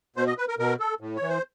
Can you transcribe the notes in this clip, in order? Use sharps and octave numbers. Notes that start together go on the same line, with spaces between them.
B2 C5
D#5
B4
A#4
B2 A#4
A4
A2
C#5
E3
C5